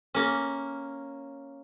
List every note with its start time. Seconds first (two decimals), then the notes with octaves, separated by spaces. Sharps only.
0.14 A#3 C#4